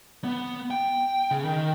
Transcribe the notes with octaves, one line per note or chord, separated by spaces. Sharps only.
B3
G5
C#3
D#3